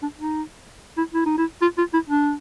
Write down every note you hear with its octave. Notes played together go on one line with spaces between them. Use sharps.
D4
D#4
E4
E4
D#4
E4
F4
F4
E4
D4